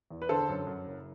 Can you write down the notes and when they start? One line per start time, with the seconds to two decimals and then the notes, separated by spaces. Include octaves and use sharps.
0.11 E2
0.22 B4
0.29 D3 A4 C5
0.49 F#2
0.67 F#2
0.86 F#1